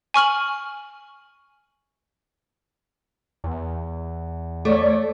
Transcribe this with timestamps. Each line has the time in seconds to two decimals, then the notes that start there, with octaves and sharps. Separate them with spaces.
0.14 G#5 C#6 F6 F#7
3.44 E2
4.65 A3 C#5 D5